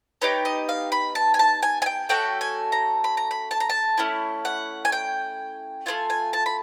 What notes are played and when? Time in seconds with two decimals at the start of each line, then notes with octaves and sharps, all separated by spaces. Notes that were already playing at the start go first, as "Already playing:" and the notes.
0.22 B3 D#4 G4 C#5
0.45 D#5
0.69 F5
0.92 B5
1.15 A5
1.34 G#5
1.39 A5
1.62 G#5
1.82 G#5
1.86 G5
2.09 A3 C#4 F#4 A4 G5
2.41 G#5
2.72 A#5
3.04 B5
3.17 A#5
3.31 B5
3.51 A5
3.60 A#5
3.69 A5
3.98 A3 C#4 E4
4.45 F#5
4.85 G#5
4.92 G5
5.86 A3 C4 F4 G#5
6.10 G#5
6.33 A5
6.46 B5